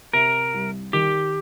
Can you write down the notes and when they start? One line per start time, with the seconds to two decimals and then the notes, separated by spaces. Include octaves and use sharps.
0.13 C3 A#4
0.54 C2
0.93 D#3 G4